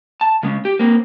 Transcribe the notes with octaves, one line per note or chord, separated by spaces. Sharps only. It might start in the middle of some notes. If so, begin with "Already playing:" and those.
A5
C#3 G#3 C#4
G4
A#3 C4